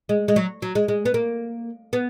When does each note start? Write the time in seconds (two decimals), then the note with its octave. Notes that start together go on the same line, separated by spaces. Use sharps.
0.09 G#3
0.28 G#3
0.36 F#3
0.62 F#3
0.75 G#3
0.88 G#3
1.05 B3
1.14 A#3
1.93 B3